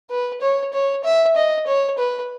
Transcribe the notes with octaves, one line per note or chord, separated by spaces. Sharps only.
B4
C#5
C#5
E5
D#5
C#5
B4